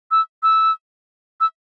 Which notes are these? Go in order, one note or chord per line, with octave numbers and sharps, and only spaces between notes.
E6
E6
E6